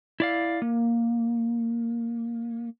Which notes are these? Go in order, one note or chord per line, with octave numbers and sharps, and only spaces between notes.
E4 D5 F5
A#3